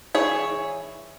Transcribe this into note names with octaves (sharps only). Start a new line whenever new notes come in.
E3 G#4 C#5